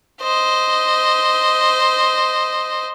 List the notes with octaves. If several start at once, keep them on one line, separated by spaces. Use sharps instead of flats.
C5 D#5